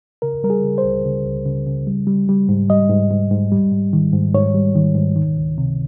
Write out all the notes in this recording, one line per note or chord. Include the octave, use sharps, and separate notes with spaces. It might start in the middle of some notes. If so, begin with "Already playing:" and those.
C#3 A#4
G3 A#4
G#4
C#3
C5
C#2
C#3
C#2
C#3
C#3
G3
G3
G3
G#2
G3 D#5
G#2
G#2
G#2
G3
G#2
D#3
G#2
G#2 C#5
G3
D#3
G#2
D#3
C#2
C3